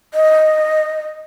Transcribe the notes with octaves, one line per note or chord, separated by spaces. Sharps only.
D#5